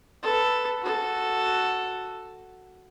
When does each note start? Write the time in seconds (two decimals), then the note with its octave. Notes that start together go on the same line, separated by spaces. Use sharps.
0.23 A4 B4
0.82 F#4 A4